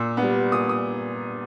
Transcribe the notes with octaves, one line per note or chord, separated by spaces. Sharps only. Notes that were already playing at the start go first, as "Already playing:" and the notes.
Already playing: A#2 E6
G3 B3
A#2 D#6
D#6